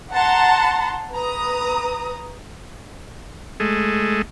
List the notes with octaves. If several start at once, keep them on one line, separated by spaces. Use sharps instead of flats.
F#5 A5 A#5 C6
B4 A#5 D#6
G#3 A3